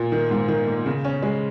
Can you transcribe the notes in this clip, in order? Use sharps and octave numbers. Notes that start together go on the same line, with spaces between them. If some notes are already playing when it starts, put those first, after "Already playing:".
Already playing: A#2
D#3
G#2
D#3
A#3
C#3
C#4
G#3